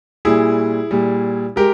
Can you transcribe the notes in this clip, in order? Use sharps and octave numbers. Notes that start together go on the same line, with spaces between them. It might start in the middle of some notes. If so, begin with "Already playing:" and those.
A#2 G3 E4 G#4
A#2 G3
G#3 G4 A#4